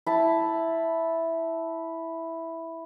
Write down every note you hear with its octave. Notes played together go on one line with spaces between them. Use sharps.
E4 A5